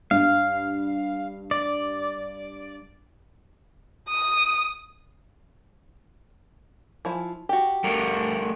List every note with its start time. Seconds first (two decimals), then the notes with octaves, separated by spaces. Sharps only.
0.11 G2 F5
1.51 D5
4.09 D#6
7.05 F3 E4 G#5
7.49 F#4 G4
7.84 G3 A3 A#4